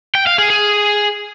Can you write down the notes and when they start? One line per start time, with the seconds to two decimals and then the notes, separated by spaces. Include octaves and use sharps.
0.15 G5
0.27 F5
0.38 G#4
0.50 G#4